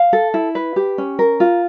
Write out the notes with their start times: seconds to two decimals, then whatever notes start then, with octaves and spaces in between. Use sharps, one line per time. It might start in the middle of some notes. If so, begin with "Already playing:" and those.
Already playing: F5
0.13 A4
0.34 E4
0.55 B4
0.76 G4
0.98 C#4
1.19 A#4
1.40 F4